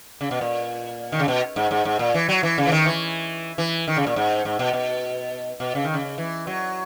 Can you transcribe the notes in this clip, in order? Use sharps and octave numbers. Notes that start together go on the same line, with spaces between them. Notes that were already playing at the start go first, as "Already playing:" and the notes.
C#3
B2
A#2
D#3
C#3
B2
G#2
G#2
G#2
A#2
E3
F#3
E3
C#3
E3
D#3
E3
E3
D#3
C#3
A#2
G#2
G#2
B2
B2
B2
C#3
D#3
C#3
E3
F#3